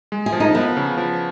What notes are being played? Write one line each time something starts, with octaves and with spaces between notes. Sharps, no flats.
G#3
G#4
F3
D#4
F3 B3
C#3
F3